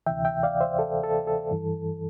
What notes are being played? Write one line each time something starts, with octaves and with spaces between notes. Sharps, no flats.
D2 C3 E3 E5 G5
E5 G5
D5 F5
C5 E5
A4
A4
A4
G2 E3